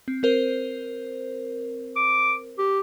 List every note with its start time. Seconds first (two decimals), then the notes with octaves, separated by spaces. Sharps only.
0.08 C4
0.23 C4 A#4 C5
1.96 D6
2.58 G4